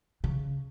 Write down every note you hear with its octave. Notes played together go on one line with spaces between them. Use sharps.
C#3